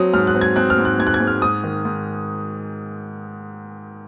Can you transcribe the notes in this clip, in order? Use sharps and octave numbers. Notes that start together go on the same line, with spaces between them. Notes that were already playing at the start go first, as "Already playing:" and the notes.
Already playing: F#3 C4 D#6
G#2 F6
F#6
C4
G#6
C4 F#6
F6
G#2
F#6
G#2 G#6
F#6
G#6
G#2
F6
G#2 D#6
D#3
G#2